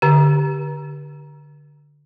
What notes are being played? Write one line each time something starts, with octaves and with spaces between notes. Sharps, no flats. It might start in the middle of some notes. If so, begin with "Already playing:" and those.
D3 G4